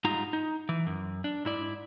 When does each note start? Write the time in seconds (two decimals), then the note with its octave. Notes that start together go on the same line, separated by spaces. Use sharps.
0.04 G#2 G3 D#4 F4 A#5
0.33 D#4
0.69 E3
0.86 F#2
1.24 D4
1.45 G#2 E4 D5